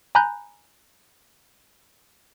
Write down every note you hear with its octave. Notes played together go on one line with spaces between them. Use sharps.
G#5 A#5 B5 F#6 G6